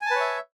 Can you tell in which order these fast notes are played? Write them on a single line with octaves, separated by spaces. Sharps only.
G#5 A5 B4 C#5 E5